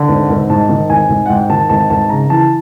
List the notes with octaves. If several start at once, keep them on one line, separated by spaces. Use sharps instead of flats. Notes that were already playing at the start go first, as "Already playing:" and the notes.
Already playing: D3
G#1
G#1
G#2 A5
D#3
G#1 G#5
G#1
F#5
G#2 G5
D#3 A5
G#1 A5
G#1 A5
C#3 A#5
E3 A5